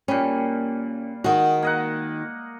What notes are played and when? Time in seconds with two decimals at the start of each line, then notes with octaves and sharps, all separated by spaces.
0.08 A#2 G3 C#4
1.24 D#3 G#3 F#4
1.62 A#3 D#5 F#5